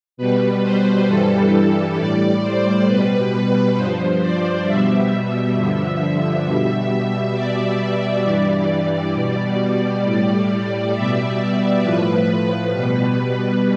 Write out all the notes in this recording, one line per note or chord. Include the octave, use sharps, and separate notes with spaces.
B2 G3 B4
C5
G2 E3 G3 A4
A4
A4
A2 G3 D5
C5
B2 G3 B4
B4
G2 F3 C5
D5
B2 G3 E5
G2 D3 F3
B2 G3
B2 G3 D5
G2 E3 G3
B2 G3
A2 G3
B2 G3 E5
D5
A2 F3 B4
B2 G3